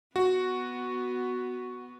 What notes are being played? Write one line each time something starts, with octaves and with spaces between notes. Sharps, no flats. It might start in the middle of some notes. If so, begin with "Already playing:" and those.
B3 F#4